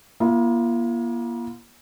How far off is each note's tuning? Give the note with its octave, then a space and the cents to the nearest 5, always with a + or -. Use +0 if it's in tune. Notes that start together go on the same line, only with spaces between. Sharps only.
A#3 +40 F4 -40